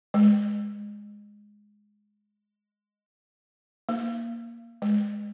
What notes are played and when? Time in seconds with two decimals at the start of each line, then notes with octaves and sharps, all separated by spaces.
0.14 G#3
3.89 A#3
4.82 G#3